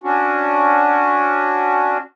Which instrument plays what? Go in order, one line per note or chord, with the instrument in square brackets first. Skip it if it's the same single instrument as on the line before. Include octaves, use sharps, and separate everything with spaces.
[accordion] C#4 D4 F#4